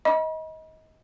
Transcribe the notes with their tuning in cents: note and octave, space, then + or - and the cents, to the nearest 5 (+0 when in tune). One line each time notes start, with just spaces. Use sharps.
D#5 +25 B5 -40